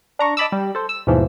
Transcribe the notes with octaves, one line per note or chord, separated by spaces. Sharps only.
D4 A#5 C#6
D#5 A5 B5 D6 E6
G3
A4 C5
E6
D#2 G#2 B2 E3 F3